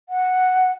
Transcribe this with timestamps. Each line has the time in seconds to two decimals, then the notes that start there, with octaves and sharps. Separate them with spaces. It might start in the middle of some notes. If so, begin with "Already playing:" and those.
0.09 F#5